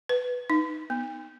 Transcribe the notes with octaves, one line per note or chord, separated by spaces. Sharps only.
B4
D#4
B3